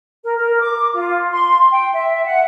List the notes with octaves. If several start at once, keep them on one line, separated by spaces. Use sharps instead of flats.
A#4
A#4
D6
F4
C6
G5
E5
F#5